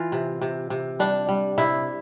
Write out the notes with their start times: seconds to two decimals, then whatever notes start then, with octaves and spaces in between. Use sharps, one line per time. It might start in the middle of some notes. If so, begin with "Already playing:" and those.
Already playing: E3 F4
0.12 C3
0.41 C3
0.70 C3
0.99 G3 D4
1.29 G3
1.58 C3 E4